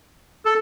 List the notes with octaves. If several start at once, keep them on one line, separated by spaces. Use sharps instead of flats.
A4